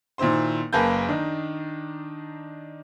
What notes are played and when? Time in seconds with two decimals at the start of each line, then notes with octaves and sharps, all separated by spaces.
0.18 A#2 D#3 E4 C5 C6
0.73 F#1 A#3 B4 G#5 A5 G6
1.08 D#3 D4 D#4